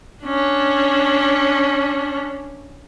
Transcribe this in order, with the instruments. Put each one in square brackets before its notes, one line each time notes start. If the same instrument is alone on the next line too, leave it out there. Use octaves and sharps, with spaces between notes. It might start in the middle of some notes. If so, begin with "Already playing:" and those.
[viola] C#4 D4